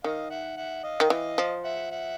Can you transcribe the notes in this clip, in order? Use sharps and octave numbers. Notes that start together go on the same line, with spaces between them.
D#3 D#5 F5
E5 F#5
E5 F#5
D#5 F5
D#3
E3
F3
E5 F#5
E5 F#5